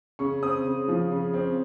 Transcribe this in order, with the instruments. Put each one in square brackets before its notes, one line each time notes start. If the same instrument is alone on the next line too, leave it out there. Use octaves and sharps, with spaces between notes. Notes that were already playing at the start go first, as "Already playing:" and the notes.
[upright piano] C#3 C#6
C4 D#6
C#3
F3
C#3
C4